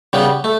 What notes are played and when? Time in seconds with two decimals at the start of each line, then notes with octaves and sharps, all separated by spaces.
0.13 C#3 G3 B3
0.44 A3